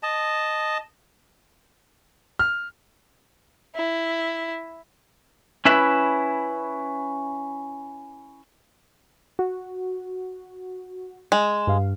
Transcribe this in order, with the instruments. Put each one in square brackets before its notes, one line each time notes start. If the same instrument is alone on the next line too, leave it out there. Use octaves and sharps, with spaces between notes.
[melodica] D#5 A5
[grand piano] F6
[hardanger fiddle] E4
[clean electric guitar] C#4 E4 B4 E5
[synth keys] F#4
[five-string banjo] G#3 [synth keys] E7
[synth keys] G2 F5